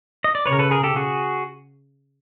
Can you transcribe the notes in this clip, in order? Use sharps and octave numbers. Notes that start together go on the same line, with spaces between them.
D#5
D5
C#3 B4 C#5
A#4
A4 B4
G#4 A#4
G4 A4
F#4 G#4